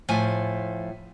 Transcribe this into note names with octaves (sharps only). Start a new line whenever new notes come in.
A2 F3 G#5